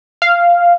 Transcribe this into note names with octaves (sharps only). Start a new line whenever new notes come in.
F5